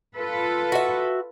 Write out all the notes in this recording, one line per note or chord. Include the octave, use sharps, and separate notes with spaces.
F4 A4 B4
F#4 E5